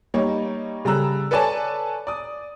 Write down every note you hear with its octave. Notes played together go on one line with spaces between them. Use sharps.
G3 A#3 D#4 C#5
C#3 G3 A4 A#5 E6 F#6
A4 B4 C#5 D5 G#5 A5
D5 D#6